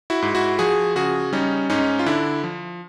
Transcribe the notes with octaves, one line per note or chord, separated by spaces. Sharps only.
E4 F#4
G#2
E4 F#4
F3 F#4 G#4
C#3 F#4 G#4
G3 C#4 D#4
G#2 C#4 D#4
F4
D3 D4 E4
F3